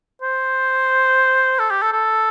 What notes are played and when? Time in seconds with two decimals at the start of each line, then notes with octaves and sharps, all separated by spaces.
0.22 C5
1.59 A4
1.71 G4
1.82 A4
1.93 A4